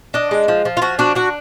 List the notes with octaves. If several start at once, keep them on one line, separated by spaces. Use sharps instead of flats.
D4 D#5
G#3
F3
F3
F4
F3 F#4
D4 F#4
D4 F#4